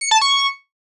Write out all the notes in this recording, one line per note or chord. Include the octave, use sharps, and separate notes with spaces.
C#7
A5
C#6